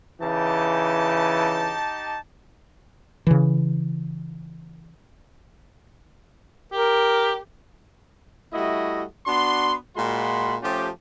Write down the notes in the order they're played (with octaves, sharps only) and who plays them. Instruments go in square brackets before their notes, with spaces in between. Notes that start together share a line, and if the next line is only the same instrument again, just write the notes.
[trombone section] C#3 E3 [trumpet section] D#4 G4 A5
[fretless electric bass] C#3 E3
[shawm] G4 [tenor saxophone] A#4
[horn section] G3 A3 E4 F#4 D#5
B3 D4 F#4 C6
A#2 G#3 F4 F#4 B5 C6
F3 A3 C#4 F4 G4